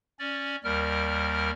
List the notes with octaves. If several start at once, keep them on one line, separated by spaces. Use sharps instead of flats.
C#4 D5
D#2 G3 A#4 F6